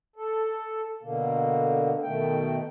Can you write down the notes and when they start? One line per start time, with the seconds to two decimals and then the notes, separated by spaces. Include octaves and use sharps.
0.16 A4
1.02 B2 D3 A#3
2.02 B2 D#3 A3 G5